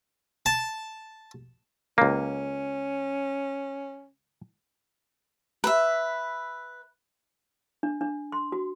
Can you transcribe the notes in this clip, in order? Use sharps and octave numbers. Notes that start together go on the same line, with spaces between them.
A5
C#2 A#3 C#4
B4 E5
D4
D4
C6
F#4